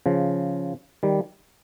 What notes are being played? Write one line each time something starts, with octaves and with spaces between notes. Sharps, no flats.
C#3 F3
D#3 G3